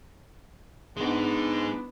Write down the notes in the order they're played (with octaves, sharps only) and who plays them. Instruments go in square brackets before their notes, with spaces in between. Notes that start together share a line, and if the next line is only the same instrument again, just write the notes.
[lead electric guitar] G#3 D#4 [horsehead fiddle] B3 D4